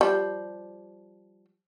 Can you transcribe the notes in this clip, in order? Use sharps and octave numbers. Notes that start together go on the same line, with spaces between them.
F3 G3